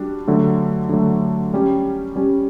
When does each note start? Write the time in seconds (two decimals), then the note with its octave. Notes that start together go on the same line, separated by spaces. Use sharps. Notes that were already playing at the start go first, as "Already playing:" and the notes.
Already playing: G3 D4 F#4
0.28 D3 F#3 A3
0.89 D3 F#3 A3
1.54 G3 C#4 G4
2.16 G3 C#4 G4